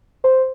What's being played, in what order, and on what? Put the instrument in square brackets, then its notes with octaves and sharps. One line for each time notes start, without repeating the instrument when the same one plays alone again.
[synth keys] C5